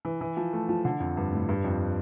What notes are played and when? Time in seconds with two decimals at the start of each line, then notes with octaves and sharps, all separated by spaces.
0.05 E3
0.21 E3
0.37 F3
0.53 A3
0.69 F3
0.85 D3
1.00 F2
1.17 G2
1.33 A2
1.49 G2
1.64 F2